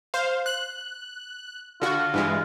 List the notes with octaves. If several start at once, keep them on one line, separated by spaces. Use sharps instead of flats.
C5 F5
F#6
D3 F4 F#4
G2 E3 G#3